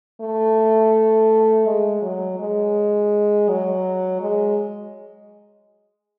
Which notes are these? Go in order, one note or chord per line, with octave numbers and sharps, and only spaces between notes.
A3
G#3
F#3
G#3
F#3
G#3